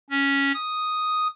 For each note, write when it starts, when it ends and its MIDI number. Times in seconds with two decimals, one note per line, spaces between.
0.10 0.52 61
0.54 1.28 87